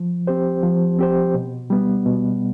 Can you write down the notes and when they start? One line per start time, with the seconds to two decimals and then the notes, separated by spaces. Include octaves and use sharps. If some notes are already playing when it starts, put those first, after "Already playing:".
Already playing: F3
0.27 C4 G4 C5
0.63 F3
0.99 C4 G4 C5
1.34 B2
1.70 G3 B3
2.06 B2